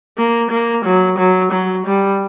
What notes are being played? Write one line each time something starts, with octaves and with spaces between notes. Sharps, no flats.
A#3
A#3
F#3
F#3
F#3
G3